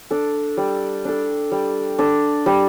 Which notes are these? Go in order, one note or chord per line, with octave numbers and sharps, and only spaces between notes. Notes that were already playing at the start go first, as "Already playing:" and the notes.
D4 A4
G3
D4 A4
G3
D4 A4
G3